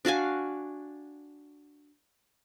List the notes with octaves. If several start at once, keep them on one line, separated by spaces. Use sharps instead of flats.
D4 F#4 F5 G#5